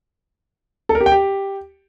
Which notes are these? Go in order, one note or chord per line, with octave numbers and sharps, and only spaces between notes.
A4
A#4
G4
G5
G4